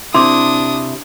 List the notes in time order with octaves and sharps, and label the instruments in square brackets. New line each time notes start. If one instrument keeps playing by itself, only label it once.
[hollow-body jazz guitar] C3 E4 [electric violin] D4 D#6 [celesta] C6 D6